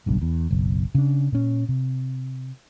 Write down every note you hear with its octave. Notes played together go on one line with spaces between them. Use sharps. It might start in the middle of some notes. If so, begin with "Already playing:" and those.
F#1 B1 G2
E2
F#1 B1
C#3 D4
A#2 C#4
C3